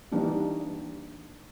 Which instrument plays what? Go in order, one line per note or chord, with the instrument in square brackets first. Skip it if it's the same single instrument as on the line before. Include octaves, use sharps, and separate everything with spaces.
[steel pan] E3 G3 A#3 D4 D#4 F#4